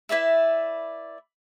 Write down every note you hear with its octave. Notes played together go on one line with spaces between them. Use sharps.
E4 B4 D5 E5